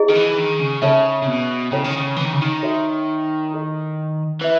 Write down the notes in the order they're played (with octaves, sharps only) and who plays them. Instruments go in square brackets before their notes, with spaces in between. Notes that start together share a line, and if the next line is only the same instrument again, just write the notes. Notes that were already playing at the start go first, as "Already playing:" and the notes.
Already playing: [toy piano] E4 G#4 D#5
[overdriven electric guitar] D#3
E3
D#3
C#3
[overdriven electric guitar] C#3 [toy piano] D#4 A4 C#5 E5
[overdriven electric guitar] C#3
B2
[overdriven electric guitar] C#3 [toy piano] C#4 E4 A4 C#5
[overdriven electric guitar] D#3
C#3
E3
D#3
C#3
D#3
[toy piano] F#4 A4 C#5 E5
E4 A4 D#5
[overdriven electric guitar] E3 [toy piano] B4 E5